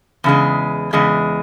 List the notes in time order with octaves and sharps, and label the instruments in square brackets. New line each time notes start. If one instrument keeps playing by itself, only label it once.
[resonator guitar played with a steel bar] E2 C#3 G#3
E2 C#3 G#3